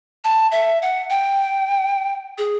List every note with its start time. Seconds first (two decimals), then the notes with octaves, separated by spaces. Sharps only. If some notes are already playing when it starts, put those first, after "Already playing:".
0.24 A5
0.52 E5
0.82 F#5
1.10 G5
2.38 G#4